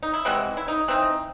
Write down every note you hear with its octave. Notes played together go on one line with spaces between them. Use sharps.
D#4
E4
C3 E3 G#3 C4 F#4
E4
D#4
E3 C4 D#4